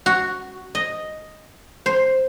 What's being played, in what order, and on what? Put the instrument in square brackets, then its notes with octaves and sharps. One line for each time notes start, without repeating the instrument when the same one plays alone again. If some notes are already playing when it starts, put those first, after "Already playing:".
[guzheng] F#4
D#5
C5